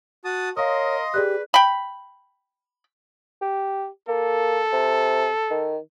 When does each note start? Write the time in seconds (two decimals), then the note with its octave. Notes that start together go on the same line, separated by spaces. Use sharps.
0.25 F#4 A5 D#6
0.57 A#4 C#5 D#5 F5 C6 D#6
1.14 G4 G#4 B4 D5 F#6
1.54 G5 B5
3.42 G4
4.08 A#3 A4
4.73 C3
5.51 D#3